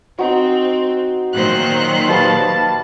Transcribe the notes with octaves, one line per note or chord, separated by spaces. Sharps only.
C4 D#4 F#4
A#2 D#3 F#3 C5 F#6
G3 B4 F5 A5